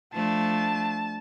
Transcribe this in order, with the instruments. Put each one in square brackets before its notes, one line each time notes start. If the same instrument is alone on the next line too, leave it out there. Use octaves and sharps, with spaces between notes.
[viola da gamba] F3 A3 D4 [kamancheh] A5